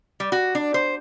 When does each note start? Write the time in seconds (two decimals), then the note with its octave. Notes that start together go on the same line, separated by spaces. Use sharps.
0.20 G3
0.32 F#4
0.55 D4
0.74 C5